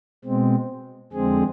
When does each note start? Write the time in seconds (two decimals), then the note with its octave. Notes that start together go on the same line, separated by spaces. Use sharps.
0.25 B2 G#3 C4
1.13 F2 D3 G#3 C4 G#4